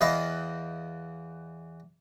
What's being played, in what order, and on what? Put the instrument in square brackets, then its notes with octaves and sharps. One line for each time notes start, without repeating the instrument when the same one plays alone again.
[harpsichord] E2 E3 B4 D#5 F5